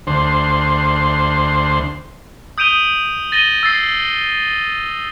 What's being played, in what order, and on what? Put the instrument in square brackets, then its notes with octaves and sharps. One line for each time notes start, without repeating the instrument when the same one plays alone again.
[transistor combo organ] D2 C5
[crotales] D#6 G6 D7 D#7 F7 G7
A6 A#6 D#7 G7
E6 A6 C7